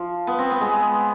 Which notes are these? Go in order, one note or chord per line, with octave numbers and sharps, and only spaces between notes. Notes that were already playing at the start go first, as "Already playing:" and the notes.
Already playing: F3
B3
C4
B3
G#3